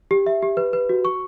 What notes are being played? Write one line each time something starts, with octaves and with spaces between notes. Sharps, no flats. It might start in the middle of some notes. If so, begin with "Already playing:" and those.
G4
E5
G4
B4
B4
F#4
C#6